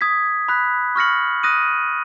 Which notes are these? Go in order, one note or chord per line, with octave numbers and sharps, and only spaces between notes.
D#6 G#6 B6
B5 F#6 B6
C#6 F6 A#6 C#7 F#7
D#6 F#6 A#6 D#7